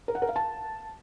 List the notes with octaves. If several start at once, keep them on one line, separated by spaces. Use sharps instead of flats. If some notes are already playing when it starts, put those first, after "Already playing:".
A#4
F#5
A#4
F5
A5